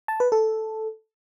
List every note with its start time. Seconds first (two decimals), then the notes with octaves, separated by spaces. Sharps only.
0.08 A5
0.20 B4
0.32 A4